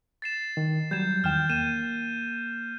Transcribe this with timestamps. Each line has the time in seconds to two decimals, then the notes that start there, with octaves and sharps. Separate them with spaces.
0.22 A6 C7 E7
0.57 D#3
0.91 F#3 G3 G6 G#6 E7
1.24 E2 D#3 G5 F6 G6 E7
1.49 A#3 D#7 E7